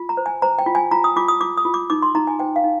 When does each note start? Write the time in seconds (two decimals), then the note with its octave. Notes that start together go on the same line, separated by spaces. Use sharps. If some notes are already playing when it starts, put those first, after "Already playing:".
Already playing: F4
0.09 A#5
0.17 C5
0.26 G#5
0.42 C5 A#5
0.59 G5
0.66 F4
0.75 G#5
0.91 F4 A#5
1.04 D#6
1.16 F4 D6
1.28 D#6
1.40 F4 D6
1.57 D#6
1.65 F4
1.74 D6
1.90 D#4 D6
2.02 C6
2.15 D#4 A#5
2.27 G#5
2.39 C5 G5
2.56 F5
2.64 D#4